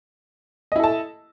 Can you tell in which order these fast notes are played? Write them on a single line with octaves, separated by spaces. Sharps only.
D#5 E4 A4 A5